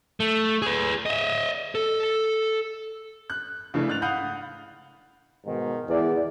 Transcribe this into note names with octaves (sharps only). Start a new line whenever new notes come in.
A3
G#4 B4
D#5 E5
A4
F#6
C#3 E3 A3 D4 E4
G#2 F#6 A6 F7
F5 F#5 B5 D#6 F#6 G6
G#2 B2 D#3
E2 E4 D5